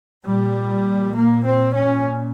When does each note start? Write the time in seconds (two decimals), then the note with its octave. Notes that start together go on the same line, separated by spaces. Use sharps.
0.25 A#2 G3
1.15 A#3
1.46 C4
1.74 C#4